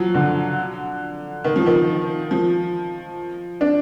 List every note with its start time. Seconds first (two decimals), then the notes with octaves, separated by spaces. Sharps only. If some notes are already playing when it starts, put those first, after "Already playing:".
Already playing: F3 F#3
0.14 D3
1.44 D#3
1.56 F3
1.67 D#3
2.31 F3
3.61 D4